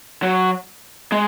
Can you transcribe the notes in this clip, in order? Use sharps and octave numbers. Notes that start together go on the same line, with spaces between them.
F#3
G#3